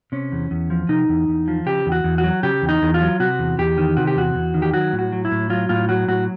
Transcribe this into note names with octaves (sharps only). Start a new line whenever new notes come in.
C3 C#4
E2
E2
F3
C3 D#4
E2
E2
F3
C#3 G4
E2
F#4
E2
F#4
F#3
C#3 G4
E2
D#4
E2
F4
F#3
C3 F#4
E2
E2 G4
D#3
C3 F#4
G4
E2 F#4
E2
D#3
G4
F#3 F#4
A2
F#4
F#3
E4
A2
F#3 F4
A2 F4
F#3 F#4
A2 F#4